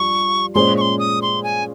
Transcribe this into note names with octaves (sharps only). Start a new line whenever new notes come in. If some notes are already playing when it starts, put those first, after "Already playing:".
Already playing: G2 F3 C#6
A#2 G#3 C#4 G#4 C5 C6
C#6
C6
D#6
C6
G#5